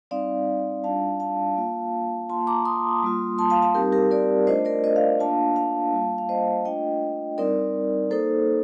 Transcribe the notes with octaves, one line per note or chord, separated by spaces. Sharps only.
G3 C4 D#4 D5 F5
G3 D4 F4 F5 A5
F5 A5
A#3 F4
A#3 F4 A5 C6
A#5 D6
C6 D#6
G3 A#3 F4
A5 C6
F5 A5
F5 A5
G3 C4 D#4 G4 A#4
G4 A#4
A#4 D5
A3 D4 F4 C5 D#5
A#4 D5
C5 D#5
D5 F5
A#3 D4 F4 F5 A5
F5 A5
G3 A#3 F4
F5
C5 D#5
A3 D4 F4 D#5 G5
G3 C4 D#4 A#4 D5
A#3 D#4 A4 C5